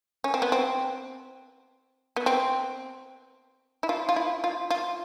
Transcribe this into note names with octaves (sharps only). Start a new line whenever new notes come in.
C#4
C4
B3
C4
B3
C4
E4
F4
F4
E4
F4
F4